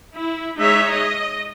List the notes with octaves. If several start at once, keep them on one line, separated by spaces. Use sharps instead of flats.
E4
G#3 D#4 C#5 E5
D#5